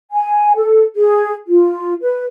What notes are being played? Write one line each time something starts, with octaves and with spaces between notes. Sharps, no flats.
G#5
A4
G#4
F4
B4